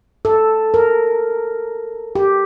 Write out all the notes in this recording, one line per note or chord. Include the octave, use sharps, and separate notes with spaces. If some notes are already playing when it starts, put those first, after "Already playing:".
A4
A#4
G4